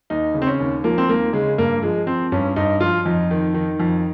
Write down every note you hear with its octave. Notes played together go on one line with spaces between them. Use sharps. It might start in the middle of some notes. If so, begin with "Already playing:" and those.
D#2 D#4
C#3
C4
C#4
D#2
F3 A#3
C4
D#2 A#3
C#3 G#3
G2 A#3
F3 G#3
F3 C4
G2 C#4
G2 D#4
F3 F4
F2 D#4
D#3
D#3
F2